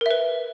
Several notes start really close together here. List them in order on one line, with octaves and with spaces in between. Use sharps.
A#4 E5 B4